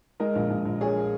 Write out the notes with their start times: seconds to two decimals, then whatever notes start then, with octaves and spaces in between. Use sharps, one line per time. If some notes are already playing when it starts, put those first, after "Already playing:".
0.20 G#3 A#4 D#5
0.35 A#1
0.50 A#1
0.66 A#1
0.81 A#1 G#4 C#5